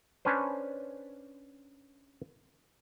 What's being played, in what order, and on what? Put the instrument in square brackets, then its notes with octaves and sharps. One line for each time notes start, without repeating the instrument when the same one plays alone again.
[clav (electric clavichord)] C#4 D4 B4 C5